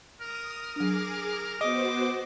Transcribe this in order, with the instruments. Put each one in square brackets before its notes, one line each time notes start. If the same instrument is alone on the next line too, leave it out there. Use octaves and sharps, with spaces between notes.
[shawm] A#4 [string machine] D#6
[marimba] F#3 D4 [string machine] G#4 D6
[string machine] B3 F#4 C5 [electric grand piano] D#5 [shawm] D6